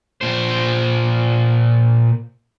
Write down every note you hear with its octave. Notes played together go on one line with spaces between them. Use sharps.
A#2 C5